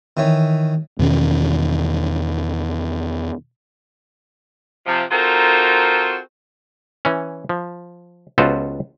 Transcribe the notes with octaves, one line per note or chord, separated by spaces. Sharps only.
D#3 E3 C#5
E2 B2 D#3 C#4
C3 F3
C4 D#4 F4 F#4 A4 A#4
E3 C#4
F3
C#2 B3 F4 F#4 A4 C5